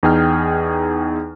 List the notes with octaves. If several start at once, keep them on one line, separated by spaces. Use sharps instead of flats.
E2 D#4 G#4 G5 F6